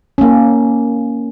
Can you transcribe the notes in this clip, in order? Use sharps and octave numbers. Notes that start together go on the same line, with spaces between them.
A#3 C#4